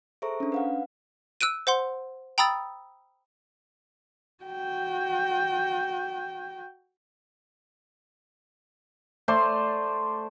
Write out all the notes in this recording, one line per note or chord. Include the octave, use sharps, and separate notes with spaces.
G#4 A4 C5 E5 A#5 C#6
C#4 D4
B4 F5 F#5
E6 F#6 D7 D#7
C5 F#5 C6
G5 A#5 B5 D#6 E6 A6
F#4 G5
A3 C5 D5 C6